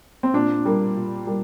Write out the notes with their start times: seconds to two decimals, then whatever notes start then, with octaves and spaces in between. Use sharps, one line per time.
0.23 C4
0.33 A#2 D4
0.65 G3 A#3
0.96 A#2
1.27 G3 A#3